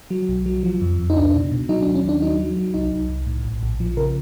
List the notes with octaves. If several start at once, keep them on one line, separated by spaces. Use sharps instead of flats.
F#3
B1
F#3
F3
F2
F2
D#4
C#2 D4
B2
B2
F#3 D#4
D4
D#2
C#4
D#2 D4
F#3 D#4
F#3
F#3
C2 D#4
C2
C2
A2
A#1
A#1
F3
C#3 A#4